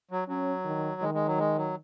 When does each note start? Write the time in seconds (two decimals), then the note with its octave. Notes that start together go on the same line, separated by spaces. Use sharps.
0.11 F#3
0.28 F#3 C#4
0.65 D#3
1.01 D#3 G#3
1.14 G#3
1.26 F#3
1.38 G#3
1.56 F#3